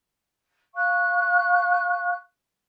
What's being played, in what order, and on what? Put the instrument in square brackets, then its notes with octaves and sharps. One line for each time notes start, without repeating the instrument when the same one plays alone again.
[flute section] F5 C#6 F#6